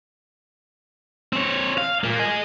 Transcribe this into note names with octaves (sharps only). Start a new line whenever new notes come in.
C4 C#5
F5
A#2 A#3
D#5 G#5